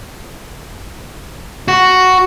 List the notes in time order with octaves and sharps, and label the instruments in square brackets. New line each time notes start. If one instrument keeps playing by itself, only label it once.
[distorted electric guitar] F#4